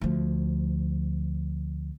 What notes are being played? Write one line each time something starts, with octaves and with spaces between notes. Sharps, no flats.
D2 F3